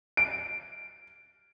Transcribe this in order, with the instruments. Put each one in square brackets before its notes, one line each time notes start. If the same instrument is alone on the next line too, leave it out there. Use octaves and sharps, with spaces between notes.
[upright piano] D7